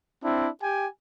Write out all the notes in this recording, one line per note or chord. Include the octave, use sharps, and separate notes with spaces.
C4 D4 E4
G4 G5 G#5